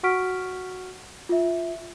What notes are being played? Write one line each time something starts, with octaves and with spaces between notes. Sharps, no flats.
F#4 F#5 C#6 F6 B6 D7
F4 E5